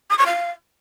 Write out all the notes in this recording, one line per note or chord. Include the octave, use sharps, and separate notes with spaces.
D#6
C#6
F5